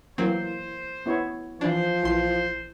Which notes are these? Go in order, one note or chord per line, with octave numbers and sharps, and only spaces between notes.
E3 F#3 A#3 C4 C5
B3 E4 C#5
E3 F3 D4 C5
A#1 E3 C6 C7